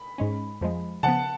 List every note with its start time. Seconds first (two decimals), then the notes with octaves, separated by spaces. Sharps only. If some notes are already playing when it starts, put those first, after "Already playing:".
Already playing: B5
0.18 G#2 G#3 C#4
0.61 F2 F3 G#3
1.03 C#3 F3 B3 F#5 A5